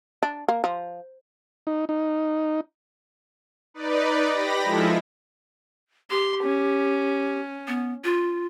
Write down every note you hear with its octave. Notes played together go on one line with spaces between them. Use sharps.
D4
A#3
F3
D#4
D#4
D#4 B4 D5
G4 B5 A#6
F3 G#3 E4 F4 A4 E5
G4 C6
C#4
B3
F4